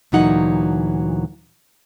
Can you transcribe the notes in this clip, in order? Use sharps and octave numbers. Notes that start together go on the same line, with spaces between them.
D2 A#2 E3 F#3 D#4 F#5